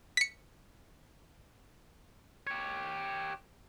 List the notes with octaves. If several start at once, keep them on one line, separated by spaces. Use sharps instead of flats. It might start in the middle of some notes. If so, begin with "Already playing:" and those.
B6 C#7
G4 C#5